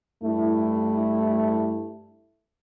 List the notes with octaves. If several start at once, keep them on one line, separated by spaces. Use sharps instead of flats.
G2 A3 E4